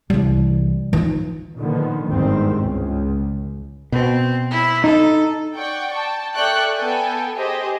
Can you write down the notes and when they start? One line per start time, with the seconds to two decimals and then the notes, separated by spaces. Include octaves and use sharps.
0.10 C2 E3 G3
0.93 E3 F3 D#4
1.57 A#2 D3 D#3 F3 A#3 B3
2.08 G1 E2 G#2 D#3 G3 C4
2.61 C#2
3.92 B2 C4
4.51 E4
4.84 D#4 A4
5.55 D5 F#5 G5 C#6
5.94 G5 A5
6.35 A4 D5 E5 G5 C#6 F#6
6.76 B3 A4 G5 G#5
7.35 G4 G#4 C5 D#5